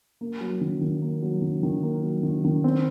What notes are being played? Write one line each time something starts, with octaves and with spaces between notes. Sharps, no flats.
A#3
F#3
D#3
D#3
A#3
F#3
D#3
D#3
A#3
F#3
D#3
D#3
C4